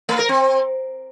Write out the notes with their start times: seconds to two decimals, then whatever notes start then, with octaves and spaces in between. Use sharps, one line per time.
0.09 A3
0.19 A#4
0.29 C4